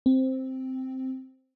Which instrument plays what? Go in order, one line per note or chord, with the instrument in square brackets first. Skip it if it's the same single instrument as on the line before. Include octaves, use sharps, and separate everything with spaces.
[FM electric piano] C4